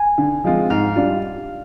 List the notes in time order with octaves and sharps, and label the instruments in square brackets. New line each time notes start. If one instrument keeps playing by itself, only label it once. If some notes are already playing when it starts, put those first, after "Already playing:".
Already playing: [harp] G#5
[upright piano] D3
F3 G#3 C4 F4
[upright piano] G#2 [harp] F5
[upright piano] G3 D4 F4